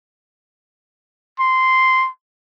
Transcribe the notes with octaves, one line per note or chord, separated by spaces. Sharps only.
C6